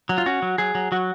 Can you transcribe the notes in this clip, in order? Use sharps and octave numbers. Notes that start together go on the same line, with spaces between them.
F#3
F4
C#4 F#4
F#3
F#3 G#4
F#3
F#3 F#4